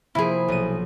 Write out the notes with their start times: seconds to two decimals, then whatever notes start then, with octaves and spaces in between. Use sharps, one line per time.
0.15 C3 F3 A#3 E4 G#4
0.48 B1 D#7